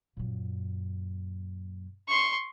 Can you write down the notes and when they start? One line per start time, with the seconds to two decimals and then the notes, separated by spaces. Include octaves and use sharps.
0.17 F#2 A#2
2.08 C6 C#6